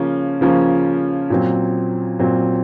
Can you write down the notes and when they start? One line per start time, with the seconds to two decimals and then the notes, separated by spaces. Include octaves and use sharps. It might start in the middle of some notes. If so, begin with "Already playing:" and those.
Already playing: C#3 F3 A#3 C#4
0.41 C#3 F3 A#3 C#4
1.30 A#2 F#3 C4
2.19 A#2 F#3 C4